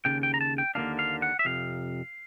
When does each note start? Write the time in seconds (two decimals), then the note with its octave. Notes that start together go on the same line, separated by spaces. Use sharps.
0.05 D#2 C#3 G5
0.23 G5
0.34 A#5
0.41 A5
0.58 G5
0.75 D#2 D3 F3 A#3 D4 F5
0.99 F5
1.22 F#5
1.39 E5
1.45 F2 C3 F5